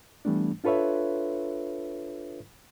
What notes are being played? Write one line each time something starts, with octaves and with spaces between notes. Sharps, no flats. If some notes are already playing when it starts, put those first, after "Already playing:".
E3 G3 A3 B3 D4
D4 F4 A4 B4 C#5 E5